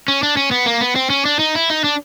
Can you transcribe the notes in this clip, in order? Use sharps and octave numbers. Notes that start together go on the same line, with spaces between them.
C#4
D4
C#4
B3
A#3
B3
C4
C#4
D4
D#4
E4
D#4
D4